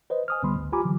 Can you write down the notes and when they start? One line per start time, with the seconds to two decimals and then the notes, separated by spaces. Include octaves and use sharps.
0.10 B4 C5 D#5
0.28 G#5 D#6 F6
0.43 C2 D3 G3 B3 B5 C6
0.56 G#1 D2
0.72 F4 G4 G#5 A#5 B5 D6
0.85 D3 E3 F#3